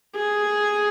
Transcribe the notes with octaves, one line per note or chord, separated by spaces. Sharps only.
G#4